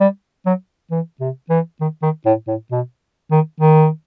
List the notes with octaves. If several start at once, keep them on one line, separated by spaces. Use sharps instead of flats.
G3
F#3
E3
C3
E3
D#3
D#3
A2
A2
B2
D#3
D#3